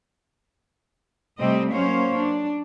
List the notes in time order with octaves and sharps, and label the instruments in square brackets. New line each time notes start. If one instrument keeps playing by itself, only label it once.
[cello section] C3 G3 A3 C4 D#5
F#3 A#3 C#4 C5 C#5 F5
D4